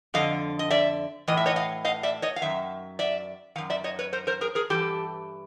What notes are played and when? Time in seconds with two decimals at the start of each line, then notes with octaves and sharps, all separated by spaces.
0.14 F2 D3 D#5 F5
0.59 D#5
0.70 D5 E5
1.28 A2 E3 D#5
1.37 E5
1.46 C#5 D#5
1.56 D#5 F5
1.85 D#5 F5
2.03 D5 E5
2.22 C#5 D#5
2.36 F5
2.42 F#2 D#3 E5
2.99 D5 E5
3.56 D#3 F5
3.58 F#2
3.70 D5 E5
3.84 C#5 D#5
3.99 B4 C#5
4.13 A#4 C5
4.27 A#4 C5
4.41 G#4 A#4
4.55 G#4 A#4
4.70 G2 E3 G4 A4